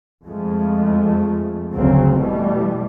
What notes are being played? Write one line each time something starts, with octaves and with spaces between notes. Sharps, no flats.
F2 F3 G#3 A3
F1 D2 C#3 F#3 C4
B2 E3 G3 A3